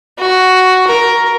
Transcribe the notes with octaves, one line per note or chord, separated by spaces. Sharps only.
F#4
A#4